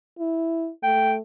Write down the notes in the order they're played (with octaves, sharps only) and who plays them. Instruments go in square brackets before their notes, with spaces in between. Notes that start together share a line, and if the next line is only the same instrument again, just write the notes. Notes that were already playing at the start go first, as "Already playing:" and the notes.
[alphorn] E4
[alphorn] A3 [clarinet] G5